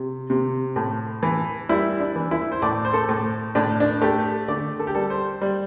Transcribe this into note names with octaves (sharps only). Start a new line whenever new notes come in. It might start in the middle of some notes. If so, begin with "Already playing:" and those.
Already playing: C3
C3
A2
E3
G3 E4
D4
E3
E4
C5
A2 D5
C5
A4
A2
A2 D4
D4
A3 G4
D3 D5
A4
G4
G3 A4
C5
G3